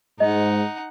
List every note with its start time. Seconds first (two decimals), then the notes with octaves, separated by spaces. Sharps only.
0.20 G#2 D#4 D#5 F#5